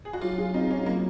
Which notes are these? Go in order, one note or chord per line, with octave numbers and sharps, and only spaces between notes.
G#4
F#4
F#3 F4
G#4
C4 D#4
F#3 C#4
F#3 A#3